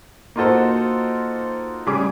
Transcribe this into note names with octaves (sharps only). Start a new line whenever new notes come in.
A#3 D#4 F4 F#4 A4 C5
C#3 G3 G#4 D6